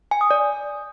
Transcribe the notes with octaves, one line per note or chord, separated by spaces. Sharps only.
G#5
D#6
D5